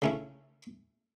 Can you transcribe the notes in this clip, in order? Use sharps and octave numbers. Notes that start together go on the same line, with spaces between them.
C#3 A3 C#4 E4